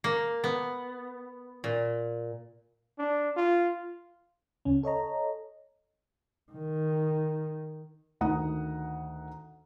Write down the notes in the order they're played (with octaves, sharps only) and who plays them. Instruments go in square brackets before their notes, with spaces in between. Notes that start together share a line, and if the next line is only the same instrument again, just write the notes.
[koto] A#3
B3
A#2
[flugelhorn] D4
F4
[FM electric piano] D2 C#3 C#4
A4 C#5 D#5 A#5
[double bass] D#3
[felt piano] D2 D#3 F#5 A#5 D#6